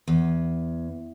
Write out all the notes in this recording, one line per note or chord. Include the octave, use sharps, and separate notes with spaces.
E2